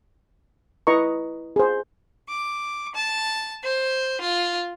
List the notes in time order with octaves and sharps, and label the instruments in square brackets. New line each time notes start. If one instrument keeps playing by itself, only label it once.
[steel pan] E4 B4 D#5 A#5 C#6
G#4 C5
[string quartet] D6
A5
C5
F4